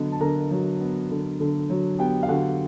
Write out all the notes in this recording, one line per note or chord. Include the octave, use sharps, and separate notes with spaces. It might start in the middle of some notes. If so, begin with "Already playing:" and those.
Already playing: D3 F#3 B3 D#5
A5
D3 A#4 A#5
F#3
B3
D3
D3
F#3
B3 G4 G5
F5
D3 F#4 F#5